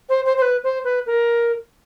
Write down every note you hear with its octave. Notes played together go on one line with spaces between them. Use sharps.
C5
C5
C5
B4
C5
B4
A#4